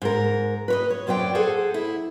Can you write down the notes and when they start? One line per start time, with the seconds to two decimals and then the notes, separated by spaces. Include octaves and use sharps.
0.02 G#2 A#4
0.68 B4 C#5 D#5
0.90 C#5
1.07 F#2 F#3 C5 D5 G5
1.35 G#4 A4 C5 F#5
1.74 E4